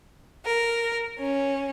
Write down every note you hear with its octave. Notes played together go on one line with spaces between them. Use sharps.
A#4
C#4